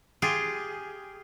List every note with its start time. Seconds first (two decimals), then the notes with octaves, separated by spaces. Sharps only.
0.22 F4 G4 G#4